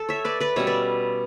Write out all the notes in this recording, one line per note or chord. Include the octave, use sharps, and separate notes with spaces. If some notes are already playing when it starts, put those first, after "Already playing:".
Already playing: A4
C#5 E5
B4 D5
B4 D5
B2 G3 C#4 C#5 E5
B4 D5